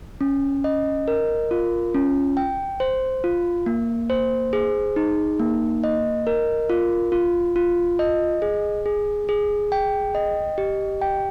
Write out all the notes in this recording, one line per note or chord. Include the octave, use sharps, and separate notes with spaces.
C#4
D#5
A#4
F4
C#4
G5
C5
F4
A#3
C5
G#4
D#4
A#3
D#5
A#4
F4
F4
F4
D#5
G#4
G#4
G#4
G5
D#5
G4
G5